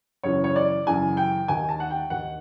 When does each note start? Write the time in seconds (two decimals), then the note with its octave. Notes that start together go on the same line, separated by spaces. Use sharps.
0.23 F#2 C#3 E3 C#5
0.44 C#5
0.56 D5
0.87 F#2 C#3 E3 G#5
1.17 G5
1.48 D#2 D#3 G#5
1.69 A5
1.80 F#5
1.91 G5
2.10 D#2 D#3 F#5